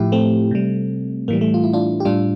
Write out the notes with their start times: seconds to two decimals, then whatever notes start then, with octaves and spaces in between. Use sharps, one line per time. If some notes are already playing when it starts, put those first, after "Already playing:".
Already playing: A2 F3 E4 G4
0.12 A3 C4
0.51 C3 G3
1.28 A2 E3 G3 A#3
1.41 A3
1.54 F4
1.64 E4
1.73 D4 F4
2.00 G4
2.05 A2 G3 D4 F4